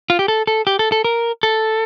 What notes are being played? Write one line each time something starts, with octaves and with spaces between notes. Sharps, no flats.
F4
G4
A4
A4
G4
A4
A4
A#4
A4